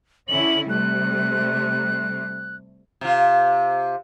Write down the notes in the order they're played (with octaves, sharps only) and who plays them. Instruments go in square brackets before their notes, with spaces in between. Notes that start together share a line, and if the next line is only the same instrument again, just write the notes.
[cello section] D3 C#4 E4 [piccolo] F#7
[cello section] C3 G3 A3 [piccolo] F#6
[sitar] C3 F4